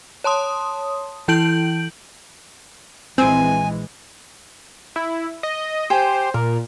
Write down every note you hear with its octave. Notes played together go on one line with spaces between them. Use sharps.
C#5 A5 C6 D#6
E3 E4 G6 D7 F#7
A#1 E3 G#3 C4 G#5
E4
D#5
G4 C5 G#5
A#2 A#4